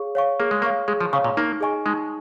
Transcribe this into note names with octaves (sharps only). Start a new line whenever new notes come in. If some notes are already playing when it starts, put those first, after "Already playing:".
Already playing: G#4 C#5 F5 C#6
C#5 F5 C#6
A#3 G#4
G#3
A#3 C#5 F5 C#6
G#3 G#4
F3
C#3 C#5 F5 C#6
A#2
A#3 D#4
G#4 D#5 G#5 C#6
G#3 D#4